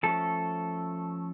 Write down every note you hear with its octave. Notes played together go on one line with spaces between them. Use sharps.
F3 A3 C#4 A4